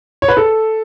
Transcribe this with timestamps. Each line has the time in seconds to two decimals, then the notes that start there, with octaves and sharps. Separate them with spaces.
0.22 C#5
0.28 B4
0.37 A4